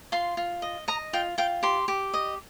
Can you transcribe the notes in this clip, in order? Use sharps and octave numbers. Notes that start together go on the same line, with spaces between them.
F4 C6
F4
D#5
D#5 A#5
F4 G5
F4 G5
G4 C6
G4
D#5